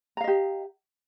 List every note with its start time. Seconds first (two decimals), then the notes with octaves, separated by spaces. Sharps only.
0.17 A#5
0.21 F5
0.24 D#5
0.28 G4